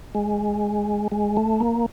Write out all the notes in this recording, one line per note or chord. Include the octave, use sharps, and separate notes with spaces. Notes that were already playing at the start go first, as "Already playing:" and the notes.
G#3
G#3
A3
A#3